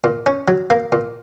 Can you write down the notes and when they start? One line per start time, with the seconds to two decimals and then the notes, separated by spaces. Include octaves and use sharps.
0.04 A#2
0.26 C#4
0.48 F#3
0.70 A#3
0.92 A#2